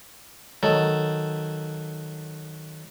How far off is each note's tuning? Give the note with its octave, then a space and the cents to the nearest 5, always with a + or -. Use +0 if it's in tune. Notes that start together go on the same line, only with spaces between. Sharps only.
D#3 +0 F#3 +0 A4 +0